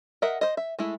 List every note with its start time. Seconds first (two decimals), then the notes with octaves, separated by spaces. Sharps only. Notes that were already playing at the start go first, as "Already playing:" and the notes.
0.22 A#4 D#5 E5 F#5
0.41 C5 D#5
0.57 E5
0.79 G#3 A3 E4